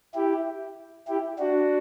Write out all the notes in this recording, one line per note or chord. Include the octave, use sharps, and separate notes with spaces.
E4 G4
E4 G4
D4 F#4